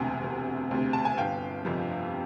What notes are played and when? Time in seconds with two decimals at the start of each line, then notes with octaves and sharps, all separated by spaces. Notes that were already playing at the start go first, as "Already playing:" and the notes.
Already playing: E1 D2 C3 F#5 G#5
0.23 E1
0.71 D2 C3
0.93 A5
1.05 G#5
1.18 G1 F5 G5
1.65 F2 C3 F3